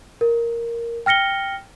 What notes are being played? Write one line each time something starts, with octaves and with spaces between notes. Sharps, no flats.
A#4
G5 F6 A#6 C#7 G7